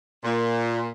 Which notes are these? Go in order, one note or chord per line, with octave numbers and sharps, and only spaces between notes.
A#2